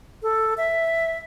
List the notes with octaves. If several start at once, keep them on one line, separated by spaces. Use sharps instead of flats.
A4
E5